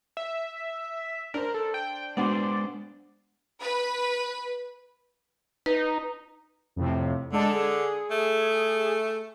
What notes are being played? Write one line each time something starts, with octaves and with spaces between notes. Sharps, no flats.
E5
D4 A#4 C5
A4
G5
G#3 B3 D4 F#4 C5 D5
B4
D#4 B4
F2 A2 C3
D3 G#3 D4 A4
G#4
A3